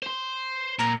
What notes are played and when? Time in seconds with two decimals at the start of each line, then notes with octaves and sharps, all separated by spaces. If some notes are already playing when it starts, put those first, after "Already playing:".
0.02 C5 C6
0.79 A#2 A#5